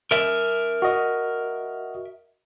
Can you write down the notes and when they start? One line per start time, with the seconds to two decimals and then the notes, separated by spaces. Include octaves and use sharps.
0.11 A#4 E5
0.82 F#4 D#5